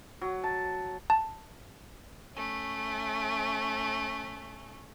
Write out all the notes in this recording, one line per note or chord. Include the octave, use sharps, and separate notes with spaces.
F#3
A5
A5
A3 C#4